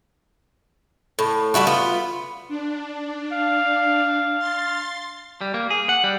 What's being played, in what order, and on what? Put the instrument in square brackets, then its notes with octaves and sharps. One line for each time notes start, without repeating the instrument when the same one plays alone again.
[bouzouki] A2
G3 G#3 E4 F#4
B3 F4
[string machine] D4
[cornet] F5
[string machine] C6 A6
[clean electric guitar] G3
A#3
G#4
F#5
G3